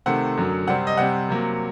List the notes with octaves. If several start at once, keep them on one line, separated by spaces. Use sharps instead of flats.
C3 D#3 A3 C4 F#5
F#2 D3 F#3
C3 G3 C4 F#5
D#5
C3 G3 C4 F#5
C3 F#3 A#3